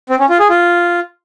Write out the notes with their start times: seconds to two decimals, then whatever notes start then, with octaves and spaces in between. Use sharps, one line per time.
0.09 C4
0.19 C#4
0.29 F4
0.40 G#4
0.50 F4